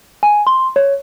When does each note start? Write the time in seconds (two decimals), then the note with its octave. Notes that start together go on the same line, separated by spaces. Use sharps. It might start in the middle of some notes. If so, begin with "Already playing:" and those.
0.23 G#5
0.47 C6
0.76 C#5